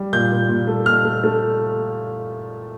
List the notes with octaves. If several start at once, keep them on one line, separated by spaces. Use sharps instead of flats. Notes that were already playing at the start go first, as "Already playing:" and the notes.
Already playing: G3
A#2 G6
A#2
A#2
A3
A#2 F6
A3
A3